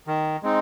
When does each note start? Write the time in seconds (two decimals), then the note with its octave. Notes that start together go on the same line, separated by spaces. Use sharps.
0.07 D#3
0.43 G#3 C4 D#4